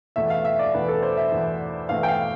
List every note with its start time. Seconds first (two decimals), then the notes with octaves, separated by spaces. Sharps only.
0.16 E2 B2 A3 E5
0.30 F5
0.45 E5
0.59 D5
0.74 E2 B2 A3 B4
0.88 A4
1.03 C5
1.17 E5
1.32 E2 B2 A3
1.89 E2 B2 A3 F5
2.03 G5
2.08 F5